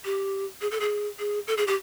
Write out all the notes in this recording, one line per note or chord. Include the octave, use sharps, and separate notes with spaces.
G4
G#4
A4
G#4
G#4
A4
G#4
G4